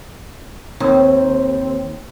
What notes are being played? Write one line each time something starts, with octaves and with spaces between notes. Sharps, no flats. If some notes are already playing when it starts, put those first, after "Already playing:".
D#2 C4